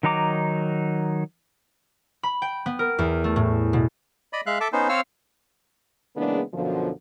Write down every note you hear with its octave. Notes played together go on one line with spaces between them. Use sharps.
D#3 F#3 D#4 A#5 D6
B5
G5
B3
A#4
E2
A3
A2
B2
D5 D#5 B5
G#3 E5 F5 F#6
A4 E5 A5 D6
B3 C#4 D#4 C5
C4 C5 C#5 F5 E6 F6
C#3 E3 G#3 A#3 B3 D4
F#2 B2 D3 F3